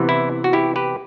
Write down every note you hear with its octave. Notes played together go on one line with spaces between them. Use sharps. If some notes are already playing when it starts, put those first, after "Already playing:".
Already playing: C3 E3 B3
E4
F#4
E4 G4
G4 B4